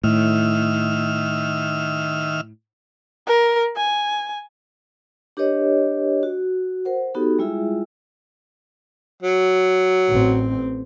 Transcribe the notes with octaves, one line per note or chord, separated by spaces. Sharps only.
A2 D#3 E5 F6
A#4
G#5
D4 G4 A#4 B4 C#5 D#5
F#4
A#4 C5 F#5
B3 D#4 F#4 G4 A4
G3 G#3 E4 F4 G#4 E5
F#3
A1 C4